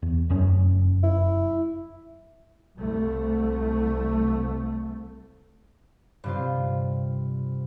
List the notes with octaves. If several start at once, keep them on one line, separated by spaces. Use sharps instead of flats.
E2
F1 F#2 C#4
E4
C2 A3
G2 C3 F4